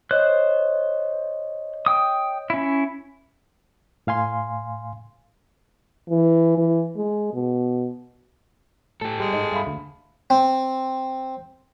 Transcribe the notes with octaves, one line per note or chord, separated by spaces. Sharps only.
C5 C#5 D#5 F#6
G5 D#6
C#4 E4
A2 F5 G#5 C6
E3
E3
G#3
B2
A2 G4 A4
G3 G#3
G#2 D#4
G2 E5 F5 B5
D2
C4